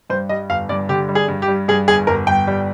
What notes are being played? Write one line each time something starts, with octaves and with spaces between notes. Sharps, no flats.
G2 C5
G3 D#5
G1 F5
G2 D5
D3 G4
G3
G#4
G2
G4
G3
G2 G#4
G1 G#4
G1 A#4
G1 G5
G3